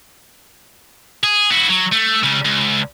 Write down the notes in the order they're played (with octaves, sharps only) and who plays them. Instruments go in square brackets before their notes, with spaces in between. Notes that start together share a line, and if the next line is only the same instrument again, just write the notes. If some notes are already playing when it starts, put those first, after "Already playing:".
[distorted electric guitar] G#4
E4 F#4
F#3
A3
C#2 C#3
C#2